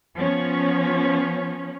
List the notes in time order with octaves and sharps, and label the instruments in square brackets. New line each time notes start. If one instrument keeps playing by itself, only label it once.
[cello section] F3 B3 C#4 C#5